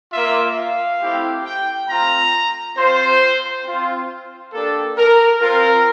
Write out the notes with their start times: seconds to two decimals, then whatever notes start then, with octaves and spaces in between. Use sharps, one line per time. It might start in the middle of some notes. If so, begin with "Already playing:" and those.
0.12 A#3 F4 E5
0.57 F5
1.01 A3 C4 E4 G4
1.45 G5
1.88 A3 C4 F4 A#5
2.77 C4 F4 C5
3.65 C4 F4
4.53 A#3 D4 G4 A4
4.97 A#4
5.41 C4 F4 A#4